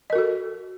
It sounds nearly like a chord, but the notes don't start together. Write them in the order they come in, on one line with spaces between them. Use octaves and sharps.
D#5 A#4 F#4 A4